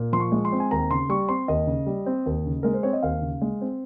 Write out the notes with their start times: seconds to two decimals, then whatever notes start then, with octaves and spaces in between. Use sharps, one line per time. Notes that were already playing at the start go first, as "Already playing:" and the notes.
Already playing: A#2
0.13 F3 C6
0.20 C#6
0.32 G#3
0.45 C6
0.52 C4
0.60 G#5
0.71 D#2 A#5
0.90 C#3 C6
1.09 G3 C#6
1.29 C4 C6
1.48 D#2 D#5
1.67 C#3
1.86 G3
2.06 C4
2.26 D#2
2.45 C#3
2.63 G#3 A#4
2.74 C5
2.83 C4 C#5
2.93 D#5
3.03 D#2 F5
3.22 C#3
3.42 G#3
3.61 C4